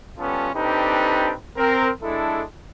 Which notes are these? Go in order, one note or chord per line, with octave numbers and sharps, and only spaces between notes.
G3 B3 C#4 F4 A4
C4 D4 D#4 G4 A4 B4
C4 A#4
G#3 D4 E4 A4